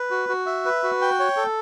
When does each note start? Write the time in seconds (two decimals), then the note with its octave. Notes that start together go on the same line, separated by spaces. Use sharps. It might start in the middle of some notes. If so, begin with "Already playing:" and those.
Already playing: B4
0.11 F#4
0.29 F#4
0.46 E5
0.65 B4
0.83 F#4
1.01 G5
1.20 C#5
1.37 A4